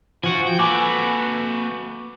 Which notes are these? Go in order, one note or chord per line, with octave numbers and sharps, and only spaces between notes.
F3 F#4 F#5 G#5
G5
A#3 F#4 A4 B4 G#5 D6